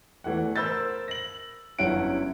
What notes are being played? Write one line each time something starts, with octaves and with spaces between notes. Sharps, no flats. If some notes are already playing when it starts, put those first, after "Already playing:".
E2 E3 A3 F#5
A#4 C5 B5 E6 G6 A6
A#6 F#7
G1 F#2 C#4 E4 F#5 D7